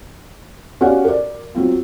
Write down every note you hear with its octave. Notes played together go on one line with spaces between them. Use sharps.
C#4 F#4 G4 D5 F5 F#5
A#4 D5
F#3 C4 F4